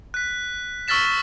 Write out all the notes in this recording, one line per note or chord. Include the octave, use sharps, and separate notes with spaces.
F#6 B6
C#6 E6 F6 A6 B6 E7